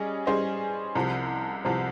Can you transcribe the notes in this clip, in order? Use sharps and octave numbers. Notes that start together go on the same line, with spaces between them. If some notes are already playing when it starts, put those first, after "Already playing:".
Already playing: G3 C#4 G#4 D#5
G3 C#4 G#4 C5 D#5
C2 C3 F3
C2 C3 F3